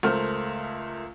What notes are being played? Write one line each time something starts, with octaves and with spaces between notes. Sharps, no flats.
C#2 A3 A#4 C5 F6